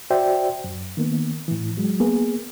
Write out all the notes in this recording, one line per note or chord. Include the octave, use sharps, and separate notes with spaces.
F#4 C5 D5 E5 G5
F#2
D#3 A#3 B3
A2 E3
F#3 G#3
A#3 B3 G#4